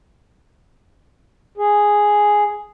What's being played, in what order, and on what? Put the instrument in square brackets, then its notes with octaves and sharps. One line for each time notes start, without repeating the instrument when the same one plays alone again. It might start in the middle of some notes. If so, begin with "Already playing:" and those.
[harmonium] G#4